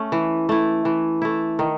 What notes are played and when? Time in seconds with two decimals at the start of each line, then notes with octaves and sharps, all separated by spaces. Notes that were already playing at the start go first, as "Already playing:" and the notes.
Already playing: A3 C#4
0.12 E3
0.49 A3 E4
0.85 E3
1.22 A3 E4
1.59 D#3